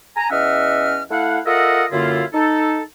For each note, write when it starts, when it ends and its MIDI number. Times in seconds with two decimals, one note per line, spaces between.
0.16 0.30 80
0.16 0.30 82
0.31 1.03 40
0.31 1.03 61
0.31 1.03 75
0.31 1.03 76
0.31 1.03 78
0.31 1.03 89
1.11 1.39 57
1.11 1.39 64
1.11 1.39 77
1.11 1.39 78
1.46 1.85 65
1.46 1.85 69
1.46 1.85 70
1.46 1.85 75
1.46 1.85 76
1.46 1.85 78
1.92 2.24 42
1.92 2.24 50
1.92 2.24 58
1.92 2.24 64
1.92 2.24 65
2.34 2.82 63
2.34 2.82 69